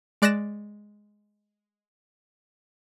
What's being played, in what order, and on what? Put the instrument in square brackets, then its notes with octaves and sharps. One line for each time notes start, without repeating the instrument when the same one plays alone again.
[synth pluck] G#3 D5 F#6 A6 A#6 E7